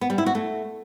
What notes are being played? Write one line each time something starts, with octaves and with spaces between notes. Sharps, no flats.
B3
G3
E4
F#4
A3